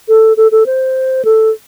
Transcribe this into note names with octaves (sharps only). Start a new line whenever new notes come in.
A4
A4
A4
C5
A4